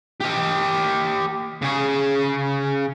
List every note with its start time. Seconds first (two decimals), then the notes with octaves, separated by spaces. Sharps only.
0.21 G4 D#5
1.62 C#3 G#4